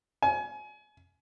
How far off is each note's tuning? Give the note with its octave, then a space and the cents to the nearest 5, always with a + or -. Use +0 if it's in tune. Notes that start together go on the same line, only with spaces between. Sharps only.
G#5 +30